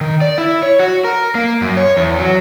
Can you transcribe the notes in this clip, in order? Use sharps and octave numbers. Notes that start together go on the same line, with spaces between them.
D#3
D5
E4
C#5
F#4
A#4
A#3
F#2
C#5
E2
F#3